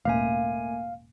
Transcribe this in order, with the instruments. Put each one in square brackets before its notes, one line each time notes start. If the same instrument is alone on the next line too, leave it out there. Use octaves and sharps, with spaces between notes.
[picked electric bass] E1 A1 [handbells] A3 A#3 G#5 [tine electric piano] F5